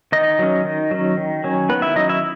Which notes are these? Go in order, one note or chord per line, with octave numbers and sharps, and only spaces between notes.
D#3 D#4 D#5
F#3 C#4
D#3
F#3 C#4
D#3
F#3 C#4
D#3 B3 B4
E4 E5
F#3 C#4 D#4 D#5
E4 E5